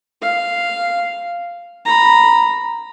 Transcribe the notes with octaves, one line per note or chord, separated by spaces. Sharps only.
F5
A#5 B5